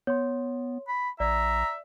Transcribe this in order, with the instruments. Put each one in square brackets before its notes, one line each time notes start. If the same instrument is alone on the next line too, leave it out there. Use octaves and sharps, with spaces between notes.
[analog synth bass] B3 [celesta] C#5 C6
[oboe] B5
[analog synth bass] A#1 [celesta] D5 [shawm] E5 [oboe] A#5